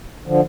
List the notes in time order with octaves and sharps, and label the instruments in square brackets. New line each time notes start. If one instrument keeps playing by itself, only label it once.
[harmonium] D3 F3